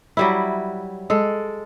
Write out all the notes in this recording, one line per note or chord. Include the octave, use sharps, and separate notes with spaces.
F#3 G3 E4
G#3 A4